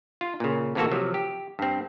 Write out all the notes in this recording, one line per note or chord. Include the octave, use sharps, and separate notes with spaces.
F4
A#2 C#3
A2 C3 E3 A#3 F#4 A4
C3 F3 F#3
G4
G2 C4